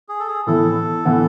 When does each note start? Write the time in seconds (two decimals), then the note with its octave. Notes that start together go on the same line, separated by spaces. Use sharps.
0.09 G#4
0.20 A4
0.28 G#4
0.47 A2 E3 B3 E4 A4
1.05 A2 E3 B3 E4